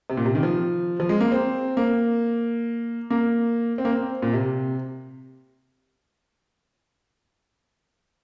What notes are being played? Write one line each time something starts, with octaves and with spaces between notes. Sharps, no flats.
C3
A#2
C3
D#3
F3
F3
G#3
A#3
C4
A#3
A#3
C4
A#3
C4
A#2
C3